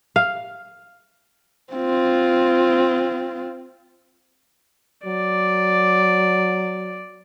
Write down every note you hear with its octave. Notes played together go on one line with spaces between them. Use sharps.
F5
C4 F4
F#3 D5